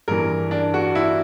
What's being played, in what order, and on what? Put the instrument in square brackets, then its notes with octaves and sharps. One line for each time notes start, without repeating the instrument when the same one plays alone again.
[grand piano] G2 E3 A#4
D4
F#4
E4